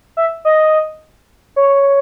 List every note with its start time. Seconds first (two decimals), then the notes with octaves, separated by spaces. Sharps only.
0.17 E5
0.45 D#5
1.56 C#5